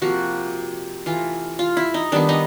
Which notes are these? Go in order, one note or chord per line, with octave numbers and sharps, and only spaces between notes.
C3 F3 A#3 F#4
E3 A3 F4
F4
E4
D#4
D#3 G3 B3 D4
D#4